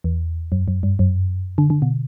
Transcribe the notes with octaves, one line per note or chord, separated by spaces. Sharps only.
E2
F#2
F#2
G2
F#2
D3
D3
B2